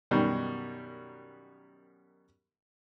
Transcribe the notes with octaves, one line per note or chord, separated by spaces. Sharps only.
F#2 B2 D#3 G3